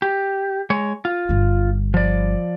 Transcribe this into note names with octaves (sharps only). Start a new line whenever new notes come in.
G4
G#3 C#5
F4
G1 G3
F3 D5